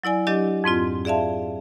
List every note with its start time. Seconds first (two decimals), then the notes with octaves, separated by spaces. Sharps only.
0.04 F#3 E4 D5 G#5
0.27 F#3 D4 G4 D#5
0.64 F2 G#2 C4 F4
1.05 G#4 D5 E5 F5 A5